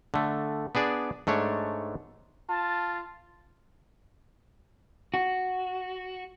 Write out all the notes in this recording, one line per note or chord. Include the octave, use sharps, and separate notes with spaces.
D3 A3
B3 D4 G#4 D5
G#2 A3 D4 C#5
F4 A5
F#4